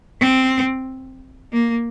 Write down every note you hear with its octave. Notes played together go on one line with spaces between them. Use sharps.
C4
A#3